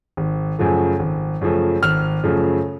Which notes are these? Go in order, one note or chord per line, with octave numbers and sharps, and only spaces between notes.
G#1
F#2 C#3 F3 A3
G#1
F#2 C#3 F3 A3
G#1 F6
F#2 C#3 F3 A3